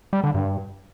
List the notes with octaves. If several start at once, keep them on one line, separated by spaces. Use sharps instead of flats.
G3
D3
G2